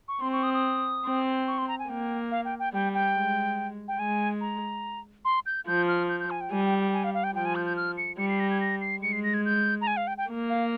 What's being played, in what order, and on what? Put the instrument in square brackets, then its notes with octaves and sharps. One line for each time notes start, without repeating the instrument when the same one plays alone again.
[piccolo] C#6
[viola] C4 [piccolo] C6
[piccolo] C#6
D#6
D#6
[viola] C4
[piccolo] C#6
C6
A#5
G#5
[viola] A#3 [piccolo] G5
[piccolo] F5
G5
G5
[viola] G3 [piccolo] G5
[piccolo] G5
[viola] G#3
[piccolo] G5
[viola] G#3 [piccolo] G#5
[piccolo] A#5
C6
G6
[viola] F3 [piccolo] G6
[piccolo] F6
G6
G6
G#5
G5
[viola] G3 [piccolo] G#5
[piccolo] G5
G5
G#5
F5
F5
G5
[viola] F3 [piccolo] G5
[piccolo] G#5
G6
G6
F6
C#7
[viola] G3 [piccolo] C#7
[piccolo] C7
A#6
G#6
A#6
C7
[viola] G#3 [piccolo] C#7
[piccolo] C7
A#6
G#6
G6
A#5
G#5
F5
G5
G5
[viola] A#3
[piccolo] F5